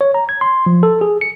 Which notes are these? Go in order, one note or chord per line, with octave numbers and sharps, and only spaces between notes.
C#5
A#5
G#6
C6
F3
A4
G#4
C#7